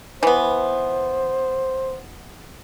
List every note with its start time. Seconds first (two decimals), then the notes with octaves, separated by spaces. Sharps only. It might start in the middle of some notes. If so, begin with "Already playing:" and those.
0.23 E3 B3 C5